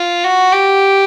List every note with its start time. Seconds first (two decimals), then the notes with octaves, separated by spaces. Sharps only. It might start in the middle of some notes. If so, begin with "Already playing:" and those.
Already playing: F4
0.24 F#4
0.53 G4